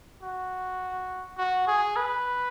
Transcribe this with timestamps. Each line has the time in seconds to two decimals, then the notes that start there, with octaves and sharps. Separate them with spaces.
0.23 F#4
1.37 F#4
1.67 G#4
1.96 B4